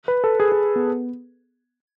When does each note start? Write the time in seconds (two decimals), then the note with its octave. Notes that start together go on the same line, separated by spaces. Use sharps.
0.08 B4
0.24 A4
0.40 G#4
0.52 G#4
0.76 B3